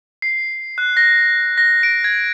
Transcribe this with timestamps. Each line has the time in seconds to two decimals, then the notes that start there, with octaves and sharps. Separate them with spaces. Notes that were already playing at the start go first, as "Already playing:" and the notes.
0.22 C7
0.78 F#6
0.97 A#6
1.58 A#6
1.83 D7
2.04 G#6